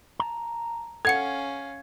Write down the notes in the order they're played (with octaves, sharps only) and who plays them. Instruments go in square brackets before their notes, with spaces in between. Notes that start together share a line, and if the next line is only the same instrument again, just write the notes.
[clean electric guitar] A5 A#5
[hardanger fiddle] C#4 F5 [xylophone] A4 F#5 C#7 [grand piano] G#6